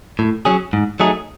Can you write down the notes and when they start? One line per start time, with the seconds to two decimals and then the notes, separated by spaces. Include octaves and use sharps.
0.19 A2
0.45 F#3 C#4 G#4
0.73 G#2
1.00 F#3 A3 D#4 G#4